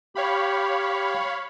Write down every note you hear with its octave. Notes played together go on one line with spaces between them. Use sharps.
G4 C#5 F5 B5